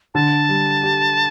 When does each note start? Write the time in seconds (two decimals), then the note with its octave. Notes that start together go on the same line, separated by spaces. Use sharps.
0.14 D3 A5
0.49 G3
0.83 G4